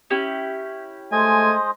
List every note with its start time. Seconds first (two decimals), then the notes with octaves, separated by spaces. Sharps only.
0.10 C#4 E4 G4
1.12 G#3 A3 C5 D#5 G#5